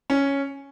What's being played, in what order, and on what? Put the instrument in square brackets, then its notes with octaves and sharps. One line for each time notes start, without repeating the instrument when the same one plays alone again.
[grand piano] C#4